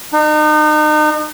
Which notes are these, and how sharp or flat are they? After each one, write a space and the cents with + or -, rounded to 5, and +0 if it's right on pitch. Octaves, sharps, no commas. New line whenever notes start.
D#4 -35